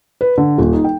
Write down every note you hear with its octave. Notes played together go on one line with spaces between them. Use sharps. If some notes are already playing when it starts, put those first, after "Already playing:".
B4
D3
D#1
D#4
G5